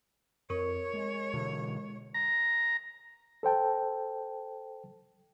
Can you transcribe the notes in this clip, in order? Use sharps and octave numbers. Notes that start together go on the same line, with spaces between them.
F2 A#4 C#5 C#6
G#3
B2 D3 E3
A#5
A4 C5 G5 A5